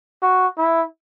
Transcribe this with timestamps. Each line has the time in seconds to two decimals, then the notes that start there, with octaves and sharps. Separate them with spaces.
0.22 F#4
0.58 E4